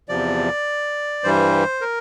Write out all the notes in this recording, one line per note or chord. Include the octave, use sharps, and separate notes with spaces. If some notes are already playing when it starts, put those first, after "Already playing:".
E2 C3 F3 D5
G2 E3 G3 C5
A#4